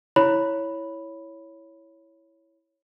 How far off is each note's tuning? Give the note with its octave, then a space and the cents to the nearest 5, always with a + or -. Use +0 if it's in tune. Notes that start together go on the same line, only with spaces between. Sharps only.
E4 +0 C#5 +0 B5 +0